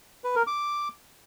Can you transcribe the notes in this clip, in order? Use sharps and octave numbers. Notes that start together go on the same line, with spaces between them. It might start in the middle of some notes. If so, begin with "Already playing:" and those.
B4
A#4
D6